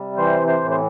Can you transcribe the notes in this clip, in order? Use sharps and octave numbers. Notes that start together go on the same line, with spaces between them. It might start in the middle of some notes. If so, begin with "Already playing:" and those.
Already playing: C3 G3
E3 C5
C5
A2
C5